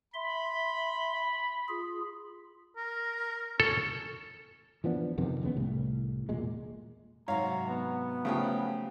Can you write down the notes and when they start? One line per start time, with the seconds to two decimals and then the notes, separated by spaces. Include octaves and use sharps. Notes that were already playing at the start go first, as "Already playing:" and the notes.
0.14 E5 B5 C6
1.69 F4 G#4
2.76 A#4
3.60 C#4 A4
4.84 E3 F3 B3 D4
5.18 F2 C3 D#3 B3
5.42 F1 D#2 C#3 B3
5.56 C2 A2
6.29 E1 A#2 G#3
7.28 G#2 C3 F#3 C#5 F5 A#5
7.68 B3
8.25 C#3 F3 F#3 A3 G4 G5